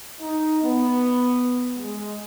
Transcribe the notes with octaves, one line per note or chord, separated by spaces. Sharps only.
D#4
B3
G#3